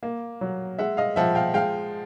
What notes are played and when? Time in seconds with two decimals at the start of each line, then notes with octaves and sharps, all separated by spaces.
0.03 A#3
0.41 F#3
0.79 G#3 E5 F#5
0.97 D#5 F5
1.16 F3 E5 F#5
1.35 F5 G5
1.54 G#3 F5 G5